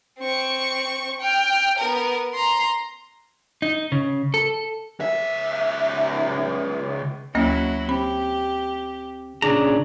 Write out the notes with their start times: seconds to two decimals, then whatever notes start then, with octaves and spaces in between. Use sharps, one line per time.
0.19 C4 C#6
1.21 G5 F6
1.78 B3 A#4
2.34 A#5 C6
3.62 D#4
3.92 C#3
4.34 A4
5.00 C#2 E5
7.35 D2 F#3 A#3 C#4 E4 F#4
7.89 C4 G4 B5
9.42 A#2 C#3 D4 G#4 A#5